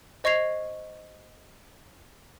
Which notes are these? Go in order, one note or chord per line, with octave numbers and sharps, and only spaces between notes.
C5 D#5 C#6 G#6 C7 F7